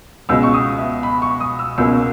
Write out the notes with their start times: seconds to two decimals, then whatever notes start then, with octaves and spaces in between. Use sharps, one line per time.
0.29 C#2 B2 G#3 C#4 E6
0.43 C#6
0.54 D#6
0.78 E5
1.03 B5
1.22 C#6
1.40 D#6
1.59 E6
1.78 C#2 B2 A#3 C#4 E6